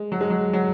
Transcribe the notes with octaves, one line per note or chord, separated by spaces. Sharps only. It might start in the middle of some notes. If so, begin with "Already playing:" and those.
Already playing: G#3
F#3
G#3
F#3
F#3